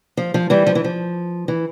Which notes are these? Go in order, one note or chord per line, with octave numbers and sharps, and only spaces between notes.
F3
F3
E3 G3
F3
E3
F3
E3